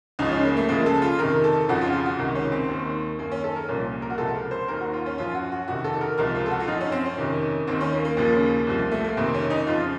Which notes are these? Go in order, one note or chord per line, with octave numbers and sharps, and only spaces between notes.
C#2 C#3 F3 D#4
C#4
A#3
A3
C#2 C#3 F3 A#3
A4
F4
F2 C3 D#3 A#4
A4
F2 C#3 F3 F#4
F4
F4
F#4
C#2 C3 D#3 A#4
C#4
C4
D#2 D#3
F#2 D#3 A#3
C#4
A4
A#4
C2 A#2 F3 C#4
A#4
F#4
C#2 C3 F3 A4
A#4
C5
D#2 D#3 A#4
F#4
F4
C#4
F#2 F3 F4
F#4
F#4
F2 C3 D#3 F#4
A4
A#4
C#2 C3 F3 A#4
F4
A4
F#4
F4
F#2 F3 D#4
C#4
C4
C#4
F2 C3 D#3
D#2 D#3 C4
C#4
A#3
A#3
D#2 C#3 F3
C2 C3 F3
A3
A#3
F2 C3 D#3 C4
C#4
D#4
F2 C#3 F3 F4